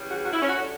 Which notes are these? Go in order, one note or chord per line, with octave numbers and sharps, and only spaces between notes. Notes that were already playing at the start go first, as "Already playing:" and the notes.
Already playing: E2 C#3 G3
F#4
F#4
E4
C#4
F#4
A2 G3